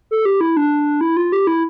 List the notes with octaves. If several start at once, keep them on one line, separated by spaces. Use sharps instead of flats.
A4
G4
E4
D4
E4
F4
G4
E4